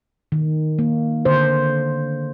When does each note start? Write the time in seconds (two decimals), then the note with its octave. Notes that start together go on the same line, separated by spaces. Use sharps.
0.32 D#3
0.79 A#3
1.25 D3 C5